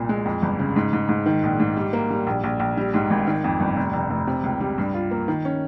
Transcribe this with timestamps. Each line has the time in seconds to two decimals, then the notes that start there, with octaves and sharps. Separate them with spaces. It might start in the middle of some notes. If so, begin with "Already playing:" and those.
Already playing: C2 A#2
0.09 G#3
0.25 F2
0.42 G1
0.59 C#3
0.76 G#2
0.93 G#2
1.09 G#2
1.26 D#3
1.44 A#1
1.60 G#2
1.77 G3
1.93 A#3
2.10 G3
2.27 A#1
2.44 A#1
2.60 A#1
2.77 G3
2.94 G#2
3.10 G#1
3.27 D#3
3.44 F2
3.60 G1
3.76 F1
3.93 F1
4.10 F1
4.27 C3
4.43 C#2
4.60 G3
4.78 G2
4.94 F4
5.11 A#3
5.28 D#3
5.45 C#4